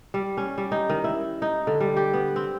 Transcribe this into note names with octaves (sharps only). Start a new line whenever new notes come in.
G3
C#4
G3
D#4
D#3
E4
D#4
D3
G3
G4
B3
C4